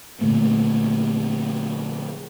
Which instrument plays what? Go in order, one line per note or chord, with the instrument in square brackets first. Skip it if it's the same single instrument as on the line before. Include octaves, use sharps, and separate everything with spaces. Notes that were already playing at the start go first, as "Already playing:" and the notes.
[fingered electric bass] A#2 D3 A3 A#3